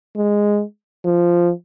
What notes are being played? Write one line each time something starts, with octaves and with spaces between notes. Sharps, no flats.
G#3
F3